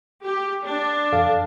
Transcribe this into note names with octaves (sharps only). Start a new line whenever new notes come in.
G4
D4
F2 A4 F5